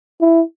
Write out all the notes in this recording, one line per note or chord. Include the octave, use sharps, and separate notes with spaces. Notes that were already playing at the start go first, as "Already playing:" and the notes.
E4